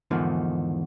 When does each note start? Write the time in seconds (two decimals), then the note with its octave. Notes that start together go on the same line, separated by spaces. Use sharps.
0.11 E2 G#2 D3 D#3 F3